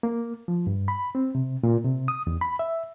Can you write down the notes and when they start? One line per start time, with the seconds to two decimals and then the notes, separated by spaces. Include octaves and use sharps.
0.03 A#3
0.48 F3
0.67 G2
0.88 B5
1.15 C4
1.35 C3
1.63 A#2
1.84 C3
2.08 D#6
2.27 E2
2.41 B5
2.59 E5